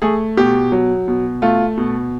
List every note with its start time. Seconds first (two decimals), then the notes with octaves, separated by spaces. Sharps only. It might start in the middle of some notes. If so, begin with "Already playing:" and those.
0.02 A3 G#4
0.37 B2 G4
0.72 F#3
1.08 B2
1.42 A3 F4
1.78 B2